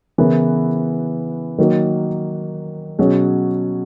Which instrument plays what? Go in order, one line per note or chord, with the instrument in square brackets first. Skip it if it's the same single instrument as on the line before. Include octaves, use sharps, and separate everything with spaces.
[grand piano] C#3 E3 B3 E4 A#4
D#3 F#3 A#3 D#4
B2 F#3 C#4 G#4